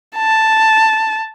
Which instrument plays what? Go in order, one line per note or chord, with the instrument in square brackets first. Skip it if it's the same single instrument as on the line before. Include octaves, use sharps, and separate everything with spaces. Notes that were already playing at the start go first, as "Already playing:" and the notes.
[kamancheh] A5